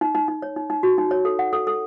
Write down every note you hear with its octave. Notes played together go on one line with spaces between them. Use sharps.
D#4
D#4
D#4
C#5
D#4
D#4
F#4
D#4
C#5
A4
F#5
A4
A4